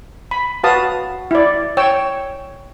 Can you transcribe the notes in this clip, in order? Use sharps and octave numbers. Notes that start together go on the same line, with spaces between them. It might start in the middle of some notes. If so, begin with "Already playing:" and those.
B5
F#4 B4 F5 A5 D#6
E4 D5
C#5 G5 E6